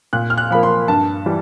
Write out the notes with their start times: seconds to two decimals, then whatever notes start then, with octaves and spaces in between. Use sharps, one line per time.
0.13 A#2 F#6
0.30 F6
0.38 F#6
0.50 F3 A#3 B5
0.63 C6
0.88 G2 A5
1.26 E3 G3